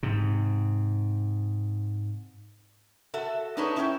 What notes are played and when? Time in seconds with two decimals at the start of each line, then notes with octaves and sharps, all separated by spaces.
0.03 G#2 C3
3.14 F#4 A4 E5
3.57 D4 D#4 G#4 A4 B4 C#5
3.76 C#4 E4 C#5 F5 G5